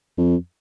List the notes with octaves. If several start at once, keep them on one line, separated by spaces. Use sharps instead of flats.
F2